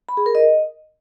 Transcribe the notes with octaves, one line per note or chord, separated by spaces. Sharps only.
B5
G#4
A#4
D#5